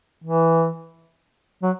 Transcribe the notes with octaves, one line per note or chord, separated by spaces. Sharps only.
E3
F#3